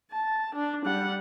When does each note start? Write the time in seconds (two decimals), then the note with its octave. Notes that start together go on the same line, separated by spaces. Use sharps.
0.11 A5
0.55 D4
0.85 G3 F#5